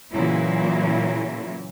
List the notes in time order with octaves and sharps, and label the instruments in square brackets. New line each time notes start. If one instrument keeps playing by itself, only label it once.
[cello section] A#2 C#3 E3 F#3 E4